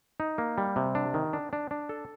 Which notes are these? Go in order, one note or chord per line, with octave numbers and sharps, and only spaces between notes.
D#4
A#3
G3
C3
D4
D#3
D4
D4
D4
A4